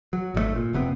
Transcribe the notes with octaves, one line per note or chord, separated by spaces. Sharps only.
F#3
G#1 C3 A3
A#2
F1 C3 B3 C4